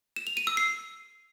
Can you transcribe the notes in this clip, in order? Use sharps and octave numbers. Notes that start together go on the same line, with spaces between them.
E7
F7
D#7
E6
C7